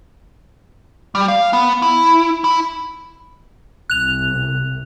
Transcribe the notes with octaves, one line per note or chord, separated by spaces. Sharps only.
G3
F5
B3
E4
E4
C2 C3 F#6 F7